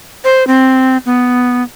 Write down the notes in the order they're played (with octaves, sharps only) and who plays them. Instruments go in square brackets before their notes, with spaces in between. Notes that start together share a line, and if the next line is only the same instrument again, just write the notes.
[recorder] C5
C4
B3